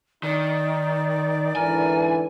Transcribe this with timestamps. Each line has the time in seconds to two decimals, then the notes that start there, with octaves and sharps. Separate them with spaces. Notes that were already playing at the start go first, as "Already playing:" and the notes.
0.23 D#3 D#4 D5
1.56 G#2 D3 E3 A#4 G#5